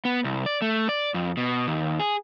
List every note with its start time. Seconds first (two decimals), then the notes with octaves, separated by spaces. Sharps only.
0.05 B3
0.24 C2
0.46 D5
0.62 A3
0.89 D5
1.14 F2
1.37 B2
1.67 D#2
2.00 G#4